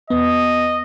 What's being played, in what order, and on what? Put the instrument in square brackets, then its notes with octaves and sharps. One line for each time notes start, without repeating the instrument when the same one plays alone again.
[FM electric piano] E2 B3 [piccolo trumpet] D#5